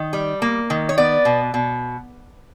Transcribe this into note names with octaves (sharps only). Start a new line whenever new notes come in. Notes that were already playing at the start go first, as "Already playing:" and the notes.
Already playing: D#3
G3
A#3
D#3
C#5
B3 D5
B2
B2